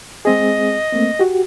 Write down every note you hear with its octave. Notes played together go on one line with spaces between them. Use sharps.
G#3 C4 G#4 D#5
A3 A#3 C4
F#4 G4